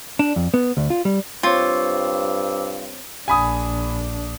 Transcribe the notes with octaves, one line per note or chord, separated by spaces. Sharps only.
D4
F2
B3
D2
F4
G3
G2 C4 F4 C5 C#5 D6 E6
A#1 D4 G#5 B5 D#6